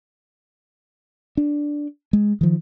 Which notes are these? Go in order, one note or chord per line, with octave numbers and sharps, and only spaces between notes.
D4
G#3
D#3 F3